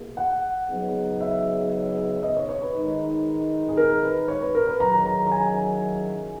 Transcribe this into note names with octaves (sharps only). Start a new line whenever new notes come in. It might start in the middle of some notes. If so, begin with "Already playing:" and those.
Already playing: B2 A#3 E4 G#4
F#5
C#3 F#3 B3 D#4 G#4
E5
D#5
C#5
C#5
B4
D#3 G#3 D#4
G#4
A#4
B4
C#5
B4
A#4
B4
D#3 F#3 C#4 E4 G#4 A#5
A#5
A#5
G#5